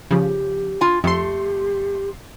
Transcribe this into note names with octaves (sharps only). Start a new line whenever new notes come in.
C#3 F3 G4
F4 G#5
F2 A3 G4 C6